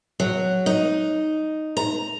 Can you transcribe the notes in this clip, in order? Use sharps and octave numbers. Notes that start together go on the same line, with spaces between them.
F#3
D#4
A#5